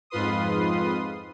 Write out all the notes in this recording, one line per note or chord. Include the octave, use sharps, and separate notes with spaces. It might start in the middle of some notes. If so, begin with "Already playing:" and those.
F2 G#2 F4 B4 C6 D#6